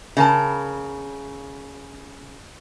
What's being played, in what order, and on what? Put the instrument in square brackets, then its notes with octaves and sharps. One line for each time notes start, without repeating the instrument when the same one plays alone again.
[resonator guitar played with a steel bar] C#3 A#4 A5